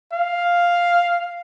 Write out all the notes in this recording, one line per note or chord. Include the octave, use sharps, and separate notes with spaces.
F5